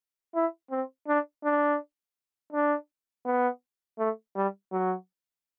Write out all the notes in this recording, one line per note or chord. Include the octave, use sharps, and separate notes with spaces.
E4
C4
D4
D4
D4
B3
A3
G3
F#3